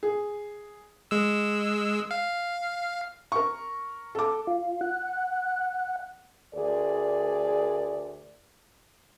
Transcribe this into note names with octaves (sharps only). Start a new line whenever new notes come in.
G#4
G#3 E6
F5
A#4 C#6
A4 D6
F4
F#5
D2 G#4 A#4 D5